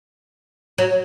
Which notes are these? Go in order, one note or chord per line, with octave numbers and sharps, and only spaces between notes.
F#3